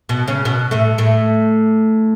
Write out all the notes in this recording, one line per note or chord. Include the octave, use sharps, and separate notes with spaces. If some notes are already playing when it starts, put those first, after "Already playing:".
B2 B3
C#3 C#4
B2 B3
A2 A3
A2 A3